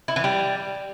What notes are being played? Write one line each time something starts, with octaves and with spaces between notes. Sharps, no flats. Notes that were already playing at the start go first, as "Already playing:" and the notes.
E4
E3
G3